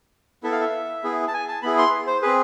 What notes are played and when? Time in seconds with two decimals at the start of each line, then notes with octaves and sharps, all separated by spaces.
0.43 B3 E4 A4 E5
0.52 F5
0.60 E5
1.03 B3 E4 G#4
1.28 A5
1.34 G#5
1.48 A5
1.62 B3 E4 G#4 B5
1.78 C6
2.07 C5
2.22 C4 G#4 B4